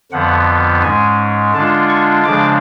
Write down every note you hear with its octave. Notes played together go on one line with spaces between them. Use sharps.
F2 D3 F3 B3 F#5
G#2 G#3 C#4 G#5
D3 G#3 D4 F4 A5
C#6
C#3 F3 G#3 D4 D6